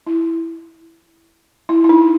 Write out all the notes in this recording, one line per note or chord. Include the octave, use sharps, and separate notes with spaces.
E4
E4
E4
D#4